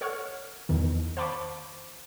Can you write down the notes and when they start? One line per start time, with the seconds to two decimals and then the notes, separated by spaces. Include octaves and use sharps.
0.01 A4 C#5 F#5 C#6 F6
0.69 E2 D#3
1.17 C5 F5 A5 B5 C#6 D6